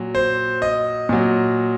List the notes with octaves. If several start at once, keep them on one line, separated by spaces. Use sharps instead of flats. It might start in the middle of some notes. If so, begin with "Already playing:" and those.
Already playing: A#2 F#3
C5
D#5
A#2 F#3